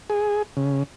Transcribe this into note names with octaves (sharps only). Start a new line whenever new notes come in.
G#4
C#3